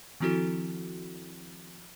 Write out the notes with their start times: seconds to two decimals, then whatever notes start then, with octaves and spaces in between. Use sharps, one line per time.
0.20 D#3 F3 C4 E4 F#4 A4